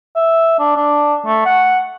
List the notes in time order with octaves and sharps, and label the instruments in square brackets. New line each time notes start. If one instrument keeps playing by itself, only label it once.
[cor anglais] E5
D4
D4
A3
F#5